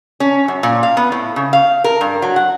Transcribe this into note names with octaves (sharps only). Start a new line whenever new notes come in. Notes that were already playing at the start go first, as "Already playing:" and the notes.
C#4
F#2
A#2
F5
B3
A2
C#3
F5
A#4
G2
F#3
F#5